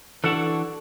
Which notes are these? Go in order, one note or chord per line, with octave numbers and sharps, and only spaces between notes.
E3 D4 F#4 A4